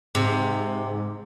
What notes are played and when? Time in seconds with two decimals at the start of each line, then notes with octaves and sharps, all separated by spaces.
0.15 G#2 C3